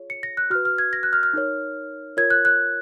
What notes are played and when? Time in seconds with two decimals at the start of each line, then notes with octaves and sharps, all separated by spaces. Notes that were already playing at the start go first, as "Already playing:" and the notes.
Already playing: F4 G#4 C#5
0.10 C#7
0.23 A#6
0.37 F#6
0.50 F#4 B4 F6
0.65 F6
0.78 G#6
0.93 A#6
1.03 F#6
1.13 F6
1.23 F6
1.34 D#4 A#4 C#5
2.17 F4 A#4 C#5 G#6
2.30 F#6
2.45 F#6